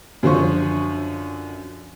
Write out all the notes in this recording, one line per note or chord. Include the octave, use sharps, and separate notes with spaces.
F#2 D3 F3 C5 C#6